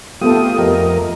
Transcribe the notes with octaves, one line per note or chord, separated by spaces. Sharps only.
A3 B3 F4 G4 A4 D#6
F2 A#4 D#5